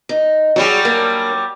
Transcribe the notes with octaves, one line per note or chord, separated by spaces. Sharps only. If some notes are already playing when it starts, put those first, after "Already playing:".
D#4
F#3 G3 F#4 G#4
A#3 D4 A#4